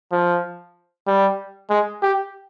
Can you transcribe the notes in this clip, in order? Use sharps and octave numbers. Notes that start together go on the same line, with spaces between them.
F3
G3
G#3
G4